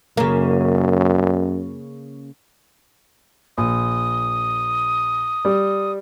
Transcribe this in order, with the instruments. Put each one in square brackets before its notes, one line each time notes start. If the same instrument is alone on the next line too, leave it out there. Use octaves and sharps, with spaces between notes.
[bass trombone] F#2 [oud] C#3 A#3
[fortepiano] A#1 [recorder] D#6
[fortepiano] G3